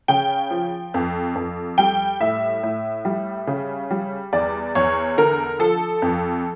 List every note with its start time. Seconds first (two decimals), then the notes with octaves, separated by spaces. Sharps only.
0.08 C#3 G5
0.51 F3
0.94 F2
1.35 F2
1.78 G3 G5
2.20 A2 E5
2.63 A2
3.05 G3
3.47 C#3
3.91 G3
4.33 E2 D5
4.75 E2 C#5
5.18 D3 A#4
5.59 F3 A4
6.02 F2